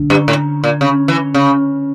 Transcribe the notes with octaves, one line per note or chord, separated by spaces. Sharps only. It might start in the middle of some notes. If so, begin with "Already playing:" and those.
Already playing: D3
G2
A2
A#2
C#3
E3
C#3